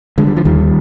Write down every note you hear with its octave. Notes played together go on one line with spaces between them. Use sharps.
D3 G#3
G3
F3
D#2 D#3 G3